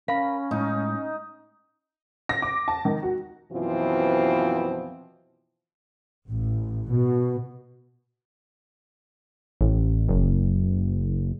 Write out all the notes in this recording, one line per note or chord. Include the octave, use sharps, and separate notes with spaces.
C#4 A#4 F5 B5
A2 G#3 D#4
A#6
D6
A5
D#3
F#4
F#2 B2 E3 F3 C4 F4
A1
B2
A1
F#1